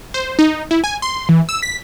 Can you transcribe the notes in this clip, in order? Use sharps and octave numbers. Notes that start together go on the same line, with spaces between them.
C5
D#4
E4
G#5
C6
E3
E6
B6